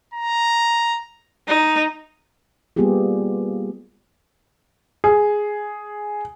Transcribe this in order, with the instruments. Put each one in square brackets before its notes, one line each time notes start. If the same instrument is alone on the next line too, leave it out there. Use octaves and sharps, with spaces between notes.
[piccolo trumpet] A#5
[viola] D#4
[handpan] G3 A#3 B3 F4 G4 G#4
[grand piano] G#4